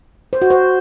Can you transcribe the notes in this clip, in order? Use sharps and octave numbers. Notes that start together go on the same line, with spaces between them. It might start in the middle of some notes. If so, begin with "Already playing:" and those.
C5
F#4
C5